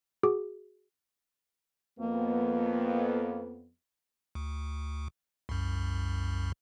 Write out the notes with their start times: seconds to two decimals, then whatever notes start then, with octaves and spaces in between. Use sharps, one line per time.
0.23 F#4 G#4 D6
1.99 F2 A#3 B3
4.35 D2
5.49 C2 F#2